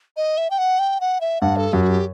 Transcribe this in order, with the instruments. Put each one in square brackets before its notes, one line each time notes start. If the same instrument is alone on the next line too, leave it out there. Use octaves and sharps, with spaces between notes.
[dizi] D#5
E5
G5
F#5
G5
F#5
E5
[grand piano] G2 [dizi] F#5
[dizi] A4
[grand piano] F#2 [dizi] G4
[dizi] F#4
G4